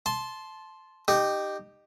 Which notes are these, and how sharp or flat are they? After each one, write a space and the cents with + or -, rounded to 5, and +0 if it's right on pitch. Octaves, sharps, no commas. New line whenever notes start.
A5 -15 C6 +0
D#4 -20 G4 +0